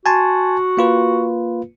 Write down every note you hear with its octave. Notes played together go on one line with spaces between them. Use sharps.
F#4 G#5 A5 C6
A#3 F4 B4